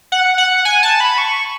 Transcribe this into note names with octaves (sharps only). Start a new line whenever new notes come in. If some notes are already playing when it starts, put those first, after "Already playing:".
F#5
F#5
G#5
A5
B5
C#6